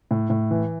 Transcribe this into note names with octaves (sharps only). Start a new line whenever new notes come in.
A2
A2
E3